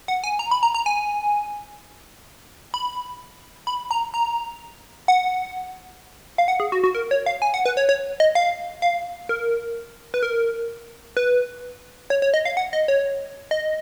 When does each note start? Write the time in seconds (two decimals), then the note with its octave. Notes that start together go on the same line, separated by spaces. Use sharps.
0.08 F#5
0.24 G#5
0.39 A#5
0.51 B5
0.63 A#5
0.74 A#5
0.86 G#5
2.74 B5
3.67 B5
3.91 A#5
4.14 A#5
5.08 F#5
6.38 F5
6.48 F#5
6.60 G#4
6.72 F#4
6.84 F#4
6.95 A#4
7.11 C#5
7.26 F5
7.42 G#5
7.54 F#5
7.66 B4
7.77 C#5
7.89 C#5
8.20 D#5
8.35 F5
8.82 F5
9.29 A#4
10.14 B4
10.23 A#4
11.17 B4
12.10 C#5
12.22 C#5
12.34 D#5
12.45 F5
12.57 F#5
12.73 D#5
12.88 C#5
13.51 D#5